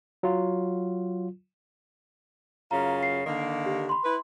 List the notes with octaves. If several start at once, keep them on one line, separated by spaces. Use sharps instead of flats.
F#3 F4
F#2 C#3 F4 A#5
C7
D3 D#3 A#3
G4
B5 C6
E4 B4